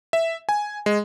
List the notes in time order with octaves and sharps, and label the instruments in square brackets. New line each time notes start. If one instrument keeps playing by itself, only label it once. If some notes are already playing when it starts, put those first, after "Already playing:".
[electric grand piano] E5
G#5
G#3